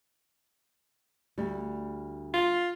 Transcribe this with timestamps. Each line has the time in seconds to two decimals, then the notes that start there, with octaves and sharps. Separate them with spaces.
1.38 D2 G3
2.34 F4